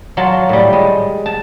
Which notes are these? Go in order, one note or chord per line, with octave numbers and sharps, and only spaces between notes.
F#3 F4 A5
A2 G3
G#3
A5